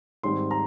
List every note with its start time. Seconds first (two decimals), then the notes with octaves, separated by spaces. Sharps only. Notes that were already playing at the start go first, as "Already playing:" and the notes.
0.23 G#2 D#3 G3 C4 D#4 C6
0.51 A#5